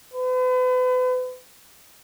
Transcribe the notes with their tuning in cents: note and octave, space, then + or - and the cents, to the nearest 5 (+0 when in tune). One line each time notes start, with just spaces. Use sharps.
B4 +40